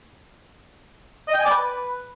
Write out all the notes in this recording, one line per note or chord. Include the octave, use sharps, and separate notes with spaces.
D#5
G5
G#5
D5
B4